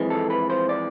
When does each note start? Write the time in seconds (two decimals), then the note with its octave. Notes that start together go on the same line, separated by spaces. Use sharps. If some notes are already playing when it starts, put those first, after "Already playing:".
Already playing: F2 E3 G#3
0.10 A4
0.30 B4
0.50 C5
0.69 D5